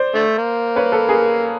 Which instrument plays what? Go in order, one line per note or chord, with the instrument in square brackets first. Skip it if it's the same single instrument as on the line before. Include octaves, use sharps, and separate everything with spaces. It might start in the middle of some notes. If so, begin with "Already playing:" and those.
Already playing: [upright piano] C5 D5
[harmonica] D3 A3
A#3
[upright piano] B4 C#5
A4 B4
G#4 A#4